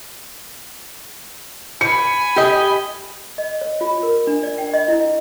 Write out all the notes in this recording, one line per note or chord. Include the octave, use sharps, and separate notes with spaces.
G#5 B5 C#7
G4 D#5
D#5
C#5
F4
A#4
D4
D5
G5
D#5
E4